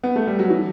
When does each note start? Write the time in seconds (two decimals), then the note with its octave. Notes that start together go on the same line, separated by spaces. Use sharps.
0.04 B3
0.16 A3
0.27 G3
0.39 F#3
0.50 E3